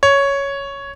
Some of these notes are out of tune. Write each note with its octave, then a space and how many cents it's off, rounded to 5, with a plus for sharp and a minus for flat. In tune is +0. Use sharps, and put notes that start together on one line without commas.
C#5 +5